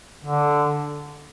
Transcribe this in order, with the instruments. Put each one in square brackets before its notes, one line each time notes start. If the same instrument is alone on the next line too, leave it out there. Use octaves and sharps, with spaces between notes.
[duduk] D3